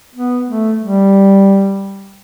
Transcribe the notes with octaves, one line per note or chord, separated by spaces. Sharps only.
B3
A3
G3